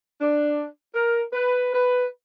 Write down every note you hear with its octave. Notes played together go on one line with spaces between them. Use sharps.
D4
A#4
B4
B4